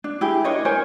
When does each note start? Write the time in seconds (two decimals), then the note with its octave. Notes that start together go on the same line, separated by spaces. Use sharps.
0.04 D4
0.21 E4 G4 G#4
0.44 D4 A#4 C#5 D#5
0.65 A#4 C5 C#5 G#5